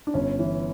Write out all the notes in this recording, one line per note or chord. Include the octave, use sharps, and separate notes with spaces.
D4
G1 C#4
E3